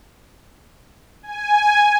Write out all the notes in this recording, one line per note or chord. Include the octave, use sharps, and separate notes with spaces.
G#5